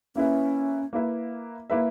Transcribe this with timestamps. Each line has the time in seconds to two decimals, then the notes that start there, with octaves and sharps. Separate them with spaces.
0.16 A#3 C#4 E4 B4 E5
0.93 A#3 E4 B4 E5
1.70 A#3 E4 B4 E5